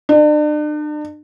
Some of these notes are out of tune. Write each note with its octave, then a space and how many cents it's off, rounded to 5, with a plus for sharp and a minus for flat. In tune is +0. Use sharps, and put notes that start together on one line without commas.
D4 +40